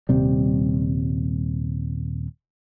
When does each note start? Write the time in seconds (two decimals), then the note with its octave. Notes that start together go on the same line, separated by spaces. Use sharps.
0.09 D#1 C3 G3